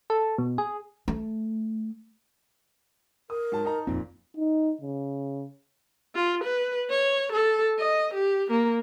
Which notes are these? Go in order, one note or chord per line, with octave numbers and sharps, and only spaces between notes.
A4
B2
G#4
A3
A#4 D#6
G#2 F#3 A5
D#4 A5 A#5
D#1 F2 A#2 C4 D#4
D#4
C#3
F4
B4
C#5
A4
D#5
G4
A#3